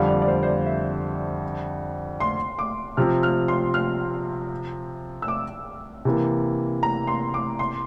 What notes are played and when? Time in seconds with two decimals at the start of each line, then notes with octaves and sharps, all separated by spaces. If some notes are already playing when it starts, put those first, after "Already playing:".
Already playing: F2 D3 G3 F5
0.09 D5
0.22 D5
0.28 C5
0.43 C5
0.47 D5
0.66 E5
2.20 C6
2.59 D6
2.97 C3 F3 C4 F6
3.23 F6
3.48 C6
3.74 F6
5.22 E6
5.28 D6
6.05 C3 E3 A#3
6.83 A#5
7.07 C6
7.34 D6
7.59 C6